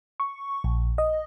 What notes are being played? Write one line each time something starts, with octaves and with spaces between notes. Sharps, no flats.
C#6
A#1
D#5